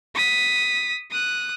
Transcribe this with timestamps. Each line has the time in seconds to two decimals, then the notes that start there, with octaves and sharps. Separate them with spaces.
0.15 D#6 B6
1.11 D#6 F#6